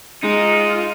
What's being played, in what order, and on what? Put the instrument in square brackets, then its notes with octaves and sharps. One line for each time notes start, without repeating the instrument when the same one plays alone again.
[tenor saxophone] G#3 [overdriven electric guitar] D#4 [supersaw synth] F4